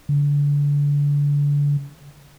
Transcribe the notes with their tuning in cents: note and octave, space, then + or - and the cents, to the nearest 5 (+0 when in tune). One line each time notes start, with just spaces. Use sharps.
D3 -30